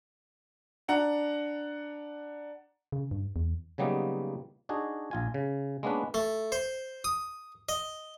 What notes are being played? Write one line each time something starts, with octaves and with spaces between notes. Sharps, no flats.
D4 F#5 A#5
C#3
G2
E2
C#3 F#3 G3 A#3 B3 D#4
D4 D#4 F#4 G#4
A#1 F4 G#5
C#3
G#3 A#3 B3 C#4 D4 B4
A3
C5
D#6
D#5